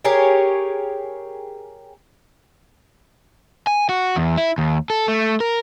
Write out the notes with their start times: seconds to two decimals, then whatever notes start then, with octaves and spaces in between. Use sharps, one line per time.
0.04 G4 G#4 A#4 C#5
3.67 G#5
3.89 F#4
4.16 E2
4.38 E4
4.58 D#2
4.90 A4
5.08 A3
5.40 A#4